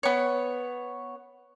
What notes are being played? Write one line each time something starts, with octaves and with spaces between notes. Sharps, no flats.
B3 C#5